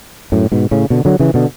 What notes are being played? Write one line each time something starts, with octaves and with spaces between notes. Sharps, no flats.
F#2 A2
G#2 B2
A2 C#3
B2 D3
D3 F#3
C#3 E3
B2 D3